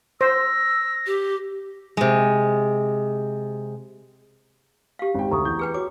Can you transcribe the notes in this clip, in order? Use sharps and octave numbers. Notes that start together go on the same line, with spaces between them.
C5 E6 A#6
G4
C3 G#3
G4 F5
G#1 G5
D2 A#5 C#6 D#6
E2 G6
G#4 B4 G5
F#4 C#5 D6